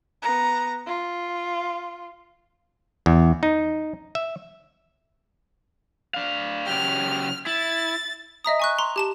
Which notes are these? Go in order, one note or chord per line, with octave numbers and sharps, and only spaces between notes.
B3 A#5
F4
E2
D#4
E5
D4 F5
C#3 F#3 G4 F6
E4 A6
D#5 E5 A#5 D#6
G#5 C#6 F#6
A#5 C6
G4 A5 E7